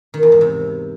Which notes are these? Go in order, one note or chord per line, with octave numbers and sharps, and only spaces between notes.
D#3
E2
G#2
C3